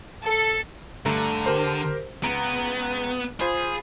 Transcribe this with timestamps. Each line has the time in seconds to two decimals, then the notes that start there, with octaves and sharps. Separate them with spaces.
0.24 A4
1.06 G2 D3 A3 A#5
1.46 G4 A#4 C5
2.24 C#2 B3 A#5 D7
3.40 F4 G#4 C5 B5